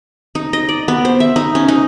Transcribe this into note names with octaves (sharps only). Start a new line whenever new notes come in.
D#4
D#5
D5
B3
C5
E5
D#4
C#4
D#4